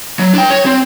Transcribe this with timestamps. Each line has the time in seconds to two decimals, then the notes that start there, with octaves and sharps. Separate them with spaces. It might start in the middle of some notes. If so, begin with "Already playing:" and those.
0.19 F#3
0.34 D4 G5
0.50 C#5
0.65 C4